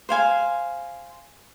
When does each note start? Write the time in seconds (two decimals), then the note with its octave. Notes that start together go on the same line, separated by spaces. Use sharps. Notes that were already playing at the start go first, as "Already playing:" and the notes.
0.09 C5 F5 G#5